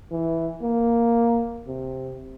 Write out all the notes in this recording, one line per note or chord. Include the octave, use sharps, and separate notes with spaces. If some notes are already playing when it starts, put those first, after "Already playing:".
E3
A#3
C3